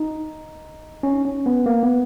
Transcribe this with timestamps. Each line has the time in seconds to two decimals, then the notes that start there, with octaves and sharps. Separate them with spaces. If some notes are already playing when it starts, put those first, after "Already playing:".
Already playing: D#4
1.03 C#4
1.25 C#4
1.46 B3
1.66 A#3
1.83 B3